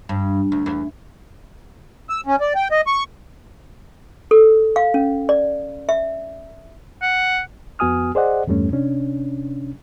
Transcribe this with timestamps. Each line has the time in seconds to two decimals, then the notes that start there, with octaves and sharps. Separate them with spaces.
0.09 G2
0.52 D2
0.66 E2
2.09 E6
2.26 C#4
2.41 D5
2.55 G5
2.71 D#5
2.87 C#6
4.31 A4
4.76 F5
4.94 C#4
5.29 D5
5.89 E5
7.02 F#5
7.79 F2 B3 F#4 G#5 D#6 F6
8.15 G#4 C5 D5 D#5 F#5
8.47 E2 G2 G3 A3 C#4
8.72 C3 C#4 D4